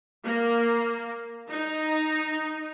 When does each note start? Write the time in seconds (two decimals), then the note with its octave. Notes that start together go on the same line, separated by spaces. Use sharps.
0.24 A#3
1.49 D#4